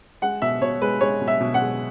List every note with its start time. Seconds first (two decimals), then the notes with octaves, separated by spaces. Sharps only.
0.22 G#3 F#5
0.42 B2 E5
0.61 B2 C#5
0.81 G#3 B4
1.01 G#3 C#5
1.21 B2
1.28 E5
1.40 B2
1.54 F#5
1.61 G#3